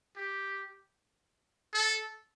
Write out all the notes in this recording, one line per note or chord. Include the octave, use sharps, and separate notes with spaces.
G4
A4